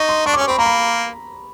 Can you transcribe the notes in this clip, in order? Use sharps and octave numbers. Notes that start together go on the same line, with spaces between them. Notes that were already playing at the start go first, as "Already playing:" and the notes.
Already playing: D#4 C#6
C6
D4 C#6
D6
C#4 C#6
C4 B5
A#3 A#5
B5